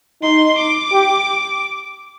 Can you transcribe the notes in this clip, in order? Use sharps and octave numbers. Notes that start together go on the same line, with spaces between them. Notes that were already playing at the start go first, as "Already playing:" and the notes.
D#4 C6
D6
G4